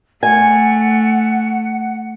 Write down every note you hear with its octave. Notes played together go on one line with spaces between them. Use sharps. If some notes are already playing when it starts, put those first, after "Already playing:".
A3 F#5 G#5